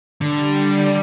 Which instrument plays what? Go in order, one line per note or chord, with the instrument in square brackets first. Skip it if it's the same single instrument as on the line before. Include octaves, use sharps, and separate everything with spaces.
[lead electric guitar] D3 [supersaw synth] G3